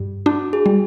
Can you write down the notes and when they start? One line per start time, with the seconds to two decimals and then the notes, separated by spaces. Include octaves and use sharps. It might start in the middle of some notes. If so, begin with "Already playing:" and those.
Already playing: G2
0.26 D4 F#4
0.53 G#4
0.66 G3